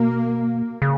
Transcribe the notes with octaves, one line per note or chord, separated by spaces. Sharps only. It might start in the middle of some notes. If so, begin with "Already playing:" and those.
Already playing: B2 A#3
C#3